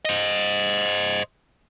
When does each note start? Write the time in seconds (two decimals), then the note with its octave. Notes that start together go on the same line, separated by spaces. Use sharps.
0.05 C5 D#5